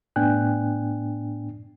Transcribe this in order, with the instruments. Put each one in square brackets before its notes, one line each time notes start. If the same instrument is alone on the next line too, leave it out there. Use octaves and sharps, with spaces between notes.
[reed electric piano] A2 B3 D4 G5 G#5 F#6